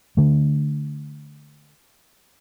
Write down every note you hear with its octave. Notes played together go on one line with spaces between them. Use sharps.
D3 A3